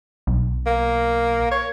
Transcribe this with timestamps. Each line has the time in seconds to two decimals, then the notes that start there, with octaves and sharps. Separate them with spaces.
0.27 B1
0.67 A#3
1.51 C#5